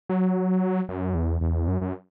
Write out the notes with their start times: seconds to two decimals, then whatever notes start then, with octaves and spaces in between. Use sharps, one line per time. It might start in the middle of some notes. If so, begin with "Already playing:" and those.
0.09 F#3
0.89 F#2
1.15 E2
1.41 E2
1.68 F#2
1.81 F#2